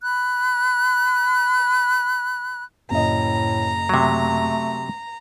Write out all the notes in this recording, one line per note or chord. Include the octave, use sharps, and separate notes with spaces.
B5 F#6
F#1 A2 D#5 A#5
C3 F#3 A3